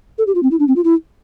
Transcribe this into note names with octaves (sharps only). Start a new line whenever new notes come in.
A4
G4
F4
C4
E4
D4
C4
F4
E4